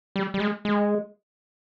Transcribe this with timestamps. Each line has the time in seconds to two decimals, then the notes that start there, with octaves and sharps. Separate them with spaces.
0.16 G3
0.34 G3
0.40 G#3
0.65 G#3